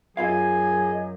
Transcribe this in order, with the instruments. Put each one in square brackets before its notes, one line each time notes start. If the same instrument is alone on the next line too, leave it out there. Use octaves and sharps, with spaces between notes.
[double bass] F#2 [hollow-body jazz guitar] E4 F4 F5 [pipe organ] G#4 D#5 [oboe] G#5